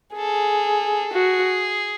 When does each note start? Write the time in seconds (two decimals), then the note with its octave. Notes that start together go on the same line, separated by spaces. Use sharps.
0.16 G#4 A4
1.13 F#4 G#4